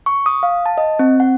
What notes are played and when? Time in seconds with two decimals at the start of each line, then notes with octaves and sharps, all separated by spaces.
0.06 C#6
0.26 D#6
0.43 F5
0.66 A5
0.78 D#5
0.99 C4
1.20 F#5